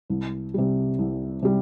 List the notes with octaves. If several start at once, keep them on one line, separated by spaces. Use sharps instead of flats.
C2
C3 G3
C2
C3 G3